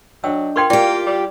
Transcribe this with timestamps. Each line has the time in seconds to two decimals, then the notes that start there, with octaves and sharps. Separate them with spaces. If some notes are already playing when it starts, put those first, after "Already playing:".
0.24 F#3 D4 D#5 G5 E6
0.56 F4 A#4 G5 C6 C#6 G#6
0.70 A#3 F4 G4 D5 G5
1.06 G3